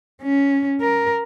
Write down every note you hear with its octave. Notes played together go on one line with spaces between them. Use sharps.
C#4
A#4